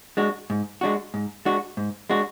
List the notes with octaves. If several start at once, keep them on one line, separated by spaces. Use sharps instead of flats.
G#3 D4 F#4
G#2
G#3 D4 F#4
G#2
G#3 D4 F#4
G#2
G#3 D4 F#4